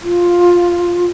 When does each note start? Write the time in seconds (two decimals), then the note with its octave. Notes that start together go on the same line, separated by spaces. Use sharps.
0.03 F4